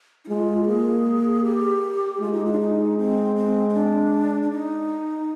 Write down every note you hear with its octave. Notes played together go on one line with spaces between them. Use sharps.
D#4
G#3 F4
G4
A#3 G#4
G4
G#3 F4
D#4
F4
D4
D#4
C4
C4
C4
D4
D4
D#4